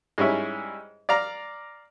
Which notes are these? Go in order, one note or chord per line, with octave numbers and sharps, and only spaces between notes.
G#2 G3 C#4 E4
D5 F5 A#5